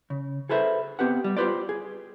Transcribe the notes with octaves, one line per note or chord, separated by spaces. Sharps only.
C#3
G#4 A4 B4 C5 E5
B3 C4 G4 B4 F#5
G3
F4 G4 B4 C5 D5
G#4